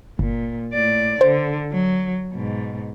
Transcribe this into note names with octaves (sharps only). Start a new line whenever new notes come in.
G1 A#2
A2 D5
D3 C5
F#3
G#2 B2